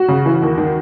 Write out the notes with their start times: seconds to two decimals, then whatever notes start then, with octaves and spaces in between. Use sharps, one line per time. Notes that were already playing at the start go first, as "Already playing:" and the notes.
Already playing: F#4
0.08 C#3
0.26 E3
0.42 D#2
0.58 D#3